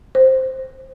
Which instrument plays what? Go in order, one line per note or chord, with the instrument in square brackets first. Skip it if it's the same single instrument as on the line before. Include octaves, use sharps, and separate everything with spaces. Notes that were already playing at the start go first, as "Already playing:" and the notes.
[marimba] C5